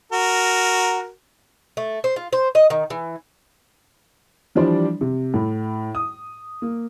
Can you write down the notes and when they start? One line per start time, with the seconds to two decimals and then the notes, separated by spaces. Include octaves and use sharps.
0.12 F#4 A#4
1.77 A3
2.04 C5
2.16 F4
2.33 C5
2.55 D#5
2.70 D#3
2.90 E3
4.55 E3 F3 G3 D4 C5 D5
5.01 C3
5.34 A2
5.95 D#6
6.62 A#3